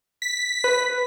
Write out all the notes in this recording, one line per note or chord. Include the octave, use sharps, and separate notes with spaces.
B6
B4